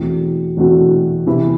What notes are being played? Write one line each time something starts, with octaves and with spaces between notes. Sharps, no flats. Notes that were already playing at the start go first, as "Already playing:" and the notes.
Already playing: E2 B2 A3 C4 F#4
E2 B2 A3 C4 F#4
C3 E3 B3 E4